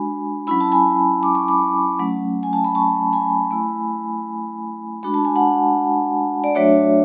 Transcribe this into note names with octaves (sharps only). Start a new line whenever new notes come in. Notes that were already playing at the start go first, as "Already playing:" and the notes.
Already playing: G#3 D4 F#4 G#5 B5
F#3 C#4 E4 B5
A5
G#5 B5
D6
C#6
B5 D6
F#3 A3 C#4
G#5
A5
B5
A5 C#6
G#5 B5
A3 E4
G#3 D4 F#4 B5
A5
G#5
F#5 A5
D5
F#3 A3 D4 F#4 C#5 E5